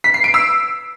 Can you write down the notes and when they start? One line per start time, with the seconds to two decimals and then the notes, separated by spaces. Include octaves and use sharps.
0.04 B6
0.14 C7
0.24 D7
0.34 E6